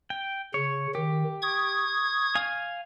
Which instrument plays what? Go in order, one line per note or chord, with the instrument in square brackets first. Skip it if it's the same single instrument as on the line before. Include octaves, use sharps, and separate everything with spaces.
[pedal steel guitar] G5
[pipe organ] C#3 [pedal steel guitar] C#5
[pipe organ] D#3 [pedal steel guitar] G4
[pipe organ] C#6 D#6 G#6
[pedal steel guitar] F5 G#5